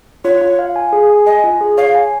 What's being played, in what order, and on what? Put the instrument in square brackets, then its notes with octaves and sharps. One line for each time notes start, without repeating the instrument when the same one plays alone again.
[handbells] F4 [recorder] C#5
[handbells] F4
F5
G#5
G#4
G#5
[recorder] D#5 [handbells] G#5
[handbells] F4
G#4
[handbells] C#5 [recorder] F5
[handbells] G#5